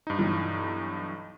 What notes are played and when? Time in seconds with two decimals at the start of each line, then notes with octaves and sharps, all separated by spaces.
0.07 G2 D#4
0.19 B1 E3 F#3